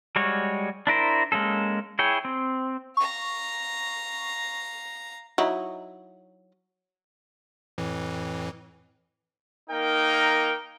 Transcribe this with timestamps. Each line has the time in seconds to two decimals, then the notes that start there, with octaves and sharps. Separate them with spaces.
0.16 G3 G#3 F#4 C#5
0.87 D4 E4 A#4 C5
1.32 G#3 A#3 C#4 A4
1.99 E4 G#4 C#5 G5
2.25 C4
2.97 F5 A#5 C#6
5.38 F#3 D#4 E4
7.78 F2 A2 E3
9.70 A#3 D#4 A#4 G5